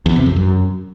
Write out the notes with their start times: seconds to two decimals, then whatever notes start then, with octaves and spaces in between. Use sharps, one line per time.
0.06 E2
0.16 C3
0.26 F2
0.36 F#2